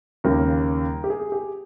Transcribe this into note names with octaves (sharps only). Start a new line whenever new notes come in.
D#2 C#3 G3 A#3 A#4
G4
G#4
G4